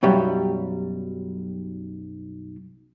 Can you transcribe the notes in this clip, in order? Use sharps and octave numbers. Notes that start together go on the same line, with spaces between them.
B1 F#2 F#3 G3